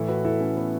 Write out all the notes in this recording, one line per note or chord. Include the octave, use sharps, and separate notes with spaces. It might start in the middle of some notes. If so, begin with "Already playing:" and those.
Already playing: A2 E3 E4 A4
F#4 B4
E4 A4
A3 C#4
B3